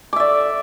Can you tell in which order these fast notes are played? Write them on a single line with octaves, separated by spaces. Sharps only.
D6 E5 D5